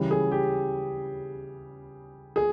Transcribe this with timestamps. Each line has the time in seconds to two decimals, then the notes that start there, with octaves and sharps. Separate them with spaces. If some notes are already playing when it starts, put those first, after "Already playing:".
Already playing: C#3 E3 G3
0.11 G#4
0.31 G4
2.36 G#4